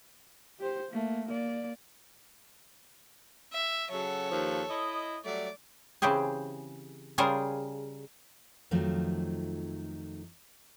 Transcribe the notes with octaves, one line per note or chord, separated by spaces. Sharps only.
G4 C5
A3 A#3
A#3 D5
E5
C#3 F#3 A4 C#5
D#2 F3
E4 D#5
F#3 G3 A3 D5
C#3 E3 C4 G4 G#4
C#3 G3 F4 G#4 A#4 C5
F2 D#3 F3 F#3 A3 D#4